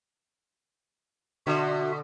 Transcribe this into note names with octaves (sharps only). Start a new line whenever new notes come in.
B2 D3 F#4 E5